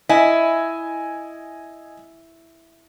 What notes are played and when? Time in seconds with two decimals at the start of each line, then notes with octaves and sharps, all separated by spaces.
0.09 E4 D#5 G#5